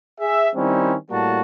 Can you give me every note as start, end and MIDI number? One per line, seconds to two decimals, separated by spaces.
0.21 0.49 68
0.21 0.49 76
0.55 0.95 51
0.55 0.95 55
0.55 0.95 60
0.55 0.95 61
0.55 0.95 63
0.55 0.95 64
1.10 1.41 45
1.10 1.41 55
1.10 1.41 58
1.10 1.41 66
1.10 1.41 81